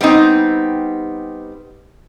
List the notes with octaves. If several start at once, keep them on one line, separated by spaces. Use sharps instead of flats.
G3 B3 C4 D#4